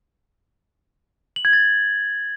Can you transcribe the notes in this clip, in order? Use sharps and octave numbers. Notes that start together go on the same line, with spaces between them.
F#7
G#6
A6